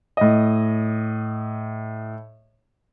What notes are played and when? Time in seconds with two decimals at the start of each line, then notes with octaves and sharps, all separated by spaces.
0.17 A2 D#5